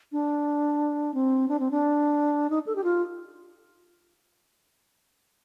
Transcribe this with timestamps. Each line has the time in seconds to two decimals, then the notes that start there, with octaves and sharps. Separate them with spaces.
0.12 D4
1.14 C4
1.48 D4
1.60 C4
1.71 D4
2.50 D#4
2.67 A4
2.76 G4
2.84 F4